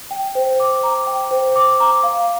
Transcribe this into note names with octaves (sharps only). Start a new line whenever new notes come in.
G5
C5
D6
A#5
G5
C5
D6
A#5
F5